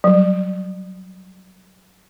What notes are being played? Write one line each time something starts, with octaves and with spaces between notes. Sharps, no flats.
F#3 G3